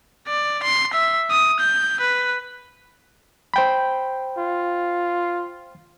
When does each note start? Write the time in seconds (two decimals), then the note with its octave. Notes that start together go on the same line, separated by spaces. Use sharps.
0.27 D5
0.63 C6
0.93 E5
1.30 D#6
1.59 G6
2.01 B4
3.54 C5 G5 B5
4.38 F4